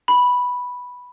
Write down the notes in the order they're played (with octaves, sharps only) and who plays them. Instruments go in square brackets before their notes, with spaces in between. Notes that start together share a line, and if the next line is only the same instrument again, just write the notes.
[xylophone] B5